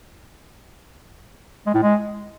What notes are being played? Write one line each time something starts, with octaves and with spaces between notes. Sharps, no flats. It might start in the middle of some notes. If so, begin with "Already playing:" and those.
G#3
A2
G#3